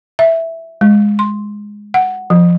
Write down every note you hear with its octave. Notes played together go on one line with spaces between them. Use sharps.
E5
G#3
C6
F#5
F3